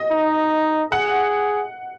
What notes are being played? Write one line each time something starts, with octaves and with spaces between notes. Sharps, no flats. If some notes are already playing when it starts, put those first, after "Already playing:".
Already playing: D#5
D#4
G#4 F#5